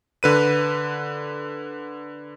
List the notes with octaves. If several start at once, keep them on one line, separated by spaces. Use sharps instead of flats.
D3 B4 D#7